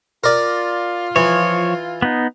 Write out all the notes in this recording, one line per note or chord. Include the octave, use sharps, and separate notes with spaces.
F4 A#4 D5
E3 F3 C#5
B3 D#4